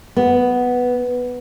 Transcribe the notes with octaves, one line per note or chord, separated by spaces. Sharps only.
B3